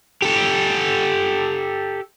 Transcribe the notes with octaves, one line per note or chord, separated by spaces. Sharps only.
G4 A4